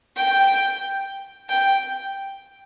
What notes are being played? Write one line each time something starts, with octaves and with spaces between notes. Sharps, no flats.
G5
G5